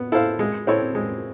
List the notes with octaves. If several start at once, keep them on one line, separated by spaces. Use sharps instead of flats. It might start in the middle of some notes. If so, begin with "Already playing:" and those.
Already playing: B3
E4 A4 C5 F5
G#3
C4 E4 A4 C#5
G#3